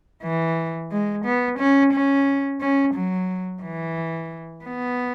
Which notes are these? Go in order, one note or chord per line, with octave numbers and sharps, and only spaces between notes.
E3
G#3
B3
C#4
C#4
C#4
F#3
E3
B3